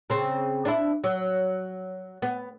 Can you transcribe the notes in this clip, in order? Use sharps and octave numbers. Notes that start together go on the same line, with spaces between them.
C#3 C4
D4 E4
F#3
B3